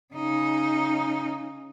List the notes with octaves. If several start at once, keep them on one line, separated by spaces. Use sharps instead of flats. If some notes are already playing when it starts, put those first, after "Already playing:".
C#3 D#4